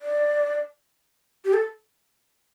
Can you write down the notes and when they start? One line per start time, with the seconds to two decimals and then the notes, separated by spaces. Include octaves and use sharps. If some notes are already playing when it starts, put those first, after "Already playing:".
0.01 D5
1.45 G4
1.53 A4